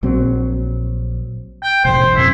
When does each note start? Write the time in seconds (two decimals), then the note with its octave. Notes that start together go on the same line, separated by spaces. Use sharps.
0.03 A#1 F#3 C4
1.63 G5
1.85 E1 A1 C5
2.16 D1 F#2 C3 E4